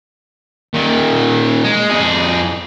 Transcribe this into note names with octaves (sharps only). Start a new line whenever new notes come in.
A#2 D#3
G#3
F2 G#4